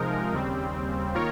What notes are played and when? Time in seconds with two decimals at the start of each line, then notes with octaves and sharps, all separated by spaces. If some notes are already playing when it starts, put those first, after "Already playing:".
Already playing: C3 F3 G#3 D#4 A#4
0.33 D#2 C#3 G3 C4
1.15 D#3 A#3 F4 A#4 C#5